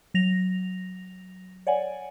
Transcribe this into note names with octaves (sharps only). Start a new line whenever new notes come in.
F#3 A#6 F7
C#5 D5 F#5 G#5